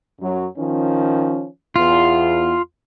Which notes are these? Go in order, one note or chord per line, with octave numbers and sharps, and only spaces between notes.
F#2 F#3
D#3 F3 C#4
E2 F4